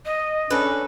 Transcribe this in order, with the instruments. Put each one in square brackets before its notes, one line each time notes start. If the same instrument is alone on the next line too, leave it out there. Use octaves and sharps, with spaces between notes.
[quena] D#5
[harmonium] C#4 D4 [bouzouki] A4 B4